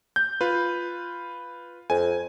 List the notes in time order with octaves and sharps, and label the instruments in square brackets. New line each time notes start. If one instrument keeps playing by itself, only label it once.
[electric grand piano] G6
F4 B4
[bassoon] F2 [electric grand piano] G#5